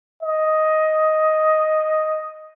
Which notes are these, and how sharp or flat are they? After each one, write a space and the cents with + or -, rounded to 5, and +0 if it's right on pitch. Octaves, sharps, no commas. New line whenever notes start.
D#5 +5